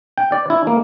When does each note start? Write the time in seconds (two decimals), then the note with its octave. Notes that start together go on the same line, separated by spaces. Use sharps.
0.18 G5
0.32 D5
0.50 E4
0.67 A#3